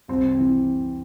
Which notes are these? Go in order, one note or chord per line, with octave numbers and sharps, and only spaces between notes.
C2 C4
C3 E3